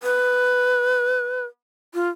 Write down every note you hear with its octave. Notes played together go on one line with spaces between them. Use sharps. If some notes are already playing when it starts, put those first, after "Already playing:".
B4
F4